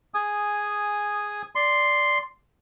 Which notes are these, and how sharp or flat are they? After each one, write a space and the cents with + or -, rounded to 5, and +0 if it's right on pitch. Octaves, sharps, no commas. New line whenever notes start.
G#4 -5 G#5 +0 D#6 -5
D5 +0 C6 +0